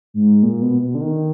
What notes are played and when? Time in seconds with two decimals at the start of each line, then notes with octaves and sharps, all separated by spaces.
0.14 G#2
0.43 A#2
0.62 B2
0.82 B2
0.95 D3
1.01 D#3